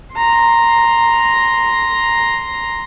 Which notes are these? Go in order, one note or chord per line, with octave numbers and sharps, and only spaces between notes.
A#5 C6